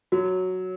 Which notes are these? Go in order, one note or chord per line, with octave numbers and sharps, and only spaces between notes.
F#3 F#4